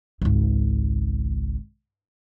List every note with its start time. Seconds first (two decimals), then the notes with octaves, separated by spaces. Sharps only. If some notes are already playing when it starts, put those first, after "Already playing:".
0.22 G#1 C#2